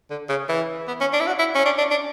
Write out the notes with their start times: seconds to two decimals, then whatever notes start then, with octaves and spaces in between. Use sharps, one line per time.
0.10 D3
0.29 C#3
0.49 E3
0.88 B3
1.01 C#4
1.13 D4
1.20 E4
1.27 F#4
1.39 E4
1.55 C#4
1.66 D4
1.78 D4
1.91 D4